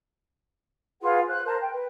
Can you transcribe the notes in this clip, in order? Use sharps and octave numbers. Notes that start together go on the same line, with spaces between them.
F4 G#4 B4 F#5
C5 F#6
A#4 C5 A5
G5
B4